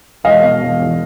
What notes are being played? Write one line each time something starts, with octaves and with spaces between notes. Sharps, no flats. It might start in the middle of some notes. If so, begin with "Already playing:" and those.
E1 D#5 F5
B2
E1
E2